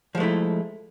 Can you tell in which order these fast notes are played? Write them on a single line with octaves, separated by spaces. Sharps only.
F3 G#3 A3 E4